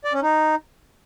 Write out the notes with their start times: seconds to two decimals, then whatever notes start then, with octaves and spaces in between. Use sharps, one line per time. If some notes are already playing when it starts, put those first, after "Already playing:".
0.05 D5
0.13 C#4
0.22 D#4